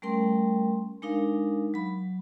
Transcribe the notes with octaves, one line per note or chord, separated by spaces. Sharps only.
G3 A3 C#4 A#4 G5 C6
G#3 D4 D#4 A#4 F5
F#3 B5